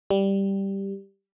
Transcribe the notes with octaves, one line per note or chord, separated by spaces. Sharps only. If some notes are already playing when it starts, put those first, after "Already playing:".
G3